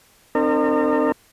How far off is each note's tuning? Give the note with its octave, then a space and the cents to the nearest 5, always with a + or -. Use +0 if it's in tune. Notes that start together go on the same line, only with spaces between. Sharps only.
C4 +0 D#4 -45 A#4 -35